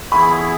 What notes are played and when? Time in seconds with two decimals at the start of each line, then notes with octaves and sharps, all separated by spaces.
0.12 E3 B3 E4 G#4 B5
0.32 B5